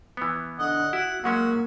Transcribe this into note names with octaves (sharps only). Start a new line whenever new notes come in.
E3 B3
D3 D#5 F#5
E4 F#4 F#5
F#3 G#3 A#3 C#4 F#4